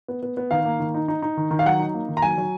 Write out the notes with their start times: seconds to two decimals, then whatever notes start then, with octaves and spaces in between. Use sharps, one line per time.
0.08 B3
0.23 B3
0.37 B3
0.51 D#3 F5
0.65 A#3
0.80 D#3
0.94 D#4
1.08 D#4
1.22 D#4
1.37 D#3
1.51 D#3
1.59 F5
1.66 F#3 F#5
1.79 D#4
1.94 A#3
2.08 D#3
2.17 A#5
2.22 F#3 G#5
2.38 F#3